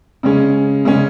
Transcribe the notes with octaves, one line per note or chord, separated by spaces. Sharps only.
C#3 G#3 C#4
C#3 G#3 C#4